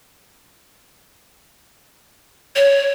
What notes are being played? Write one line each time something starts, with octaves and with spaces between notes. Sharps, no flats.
C#5